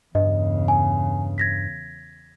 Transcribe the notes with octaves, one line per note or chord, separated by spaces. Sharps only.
E2 G2 C#3 D#5
G#5
G#6 A#6 B6